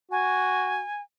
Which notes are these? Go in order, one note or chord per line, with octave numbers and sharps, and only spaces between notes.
F#4 G#5